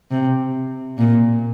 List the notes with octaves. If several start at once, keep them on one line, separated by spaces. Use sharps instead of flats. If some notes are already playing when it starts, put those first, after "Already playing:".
C3
A#2